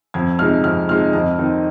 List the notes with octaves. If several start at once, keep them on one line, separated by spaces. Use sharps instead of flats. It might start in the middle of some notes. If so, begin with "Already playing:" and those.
F2 G#6
C3 F3 G#3 D#4 F6
F2 F6
C3 F3 G#3 D#4 F6
F2 D#5
D#3 C4 D#4